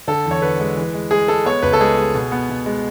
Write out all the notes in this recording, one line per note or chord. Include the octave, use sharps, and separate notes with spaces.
D3 A4
E2
C#5
D3 B4
G#3
E3
G#3
G#3 G#4
G#3 A4
B3 C#5
C#2 B4
A4
G#3 G#4
G#3
B2
B3
B2
G#3